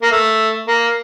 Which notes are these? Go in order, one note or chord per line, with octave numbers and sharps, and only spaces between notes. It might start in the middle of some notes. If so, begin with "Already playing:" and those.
A#3
A3
A#3